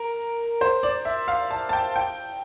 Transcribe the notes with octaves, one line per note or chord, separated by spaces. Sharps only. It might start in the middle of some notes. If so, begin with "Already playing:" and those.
Already playing: A#4
C5
D5
E5
F5
A5
A5
G5
G5